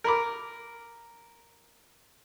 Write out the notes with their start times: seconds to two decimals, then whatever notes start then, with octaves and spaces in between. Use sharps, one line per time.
0.04 A#4 B5 D6